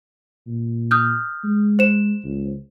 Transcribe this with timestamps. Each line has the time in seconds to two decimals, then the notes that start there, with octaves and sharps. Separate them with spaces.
0.47 A#2
0.91 D#6 F6 G6
1.44 G#3
1.79 C5 E7
2.24 C#2